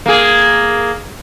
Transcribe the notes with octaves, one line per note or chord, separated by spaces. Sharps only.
A#3 G#4